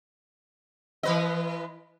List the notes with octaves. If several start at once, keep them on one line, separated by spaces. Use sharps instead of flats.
E3 B4 D#5